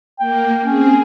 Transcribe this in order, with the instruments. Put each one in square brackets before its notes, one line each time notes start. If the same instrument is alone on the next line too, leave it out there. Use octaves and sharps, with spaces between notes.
[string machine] A#3 [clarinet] G5
[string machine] C4 G#4 [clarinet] C#4